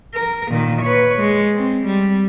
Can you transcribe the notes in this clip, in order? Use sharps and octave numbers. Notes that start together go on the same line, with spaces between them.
A#4
A#2 D#3
B4 C#5
G#3
C4
G3